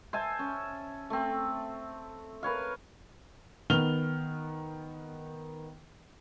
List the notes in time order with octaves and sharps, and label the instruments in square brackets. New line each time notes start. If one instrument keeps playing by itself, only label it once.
[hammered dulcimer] C5 E5 G#5 A5
C#4
A3 C4
A#4 B4 C#5 F5
[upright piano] D#3 B3 F6 F7 G7